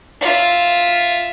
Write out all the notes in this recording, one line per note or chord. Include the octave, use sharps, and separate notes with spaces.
F4 E5